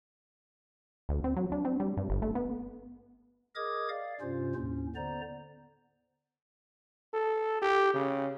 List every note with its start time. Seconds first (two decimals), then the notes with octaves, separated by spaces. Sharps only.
1.09 D2
1.24 C4
1.36 F#3
1.52 D4
1.65 C4
1.80 G3
1.97 G2
2.10 G1
2.22 A3
2.35 B3
3.55 G#4 A#4 D#5 D6 D#6 G#6
3.89 D5 F5
4.21 G2 C3 C#4 F4 C5
4.55 D#2 A2 C#4
4.96 D3 B3 C5 D5 A#5
7.13 A4
7.62 G4
7.94 C#3